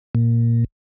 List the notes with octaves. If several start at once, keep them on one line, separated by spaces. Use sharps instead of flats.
A#2